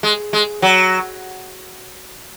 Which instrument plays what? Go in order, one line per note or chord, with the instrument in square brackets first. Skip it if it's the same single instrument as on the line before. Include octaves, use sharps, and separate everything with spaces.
[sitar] G#3
G#3
F#3